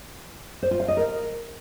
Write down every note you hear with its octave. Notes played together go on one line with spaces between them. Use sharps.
C5
F4
F5
D#5
A#4